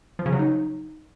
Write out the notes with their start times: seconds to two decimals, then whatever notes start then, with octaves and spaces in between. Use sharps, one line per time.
0.19 F3
0.26 C#3
0.33 F#3
0.39 D#4